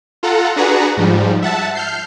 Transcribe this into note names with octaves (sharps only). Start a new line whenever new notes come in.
F4 A4 F#5 A#5
D4 F#4 G#4 B4 F#5 A#5
G#2 F3 G3
E5 F#5 A5
F6 G6 C7